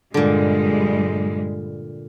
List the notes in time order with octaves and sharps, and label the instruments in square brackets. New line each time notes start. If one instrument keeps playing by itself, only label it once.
[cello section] G2 G3 G#3 [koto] A#2 D3